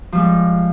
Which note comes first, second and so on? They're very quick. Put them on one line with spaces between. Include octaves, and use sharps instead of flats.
F3 G3 G#3